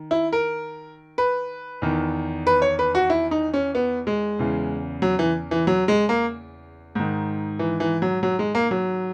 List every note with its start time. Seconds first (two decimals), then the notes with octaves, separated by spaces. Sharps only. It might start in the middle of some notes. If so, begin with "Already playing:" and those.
Already playing: D#3
0.11 E4
0.33 A#4
1.18 B4
1.82 E2 D#3
2.47 B4
2.62 C#5
2.79 B4
2.95 F#4
3.10 E4
3.31 D#4
3.54 C#4
3.75 B3
4.07 G#3
4.39 E2 C#3 E3
5.02 F#3
5.19 E3
5.51 E3
5.67 F#3
5.88 G#3
6.09 A#3
6.95 G#2 D#3
7.59 E3
7.80 E3
8.02 F#3
8.23 F#3
8.39 G#3
8.55 A#3
8.71 F#3